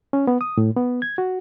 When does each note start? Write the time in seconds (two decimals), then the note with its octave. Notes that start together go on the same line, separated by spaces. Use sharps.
0.13 C#4
0.27 B3
0.41 D#6
0.57 A2
0.76 B3
1.02 G#6
1.18 F#4